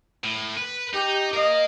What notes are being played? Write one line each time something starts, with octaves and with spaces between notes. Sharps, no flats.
A2
B4
D#4 G4
A#4 D#5 F5